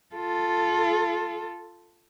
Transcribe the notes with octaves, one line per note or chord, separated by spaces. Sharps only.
F4 A4